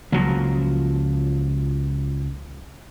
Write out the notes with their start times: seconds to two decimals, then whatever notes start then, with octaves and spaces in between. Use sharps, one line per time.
0.12 C#2 F3 F#3 A#3